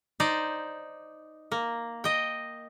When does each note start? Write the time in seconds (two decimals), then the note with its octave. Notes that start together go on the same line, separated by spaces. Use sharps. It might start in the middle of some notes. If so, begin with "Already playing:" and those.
0.20 D#4 C5 D5
1.52 A#3
2.04 D#5 G5